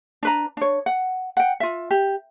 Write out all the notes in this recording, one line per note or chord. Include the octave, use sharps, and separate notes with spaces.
D4 B4 A#5
D4 C#5
F#5
F#5 G5
F4 E5
G4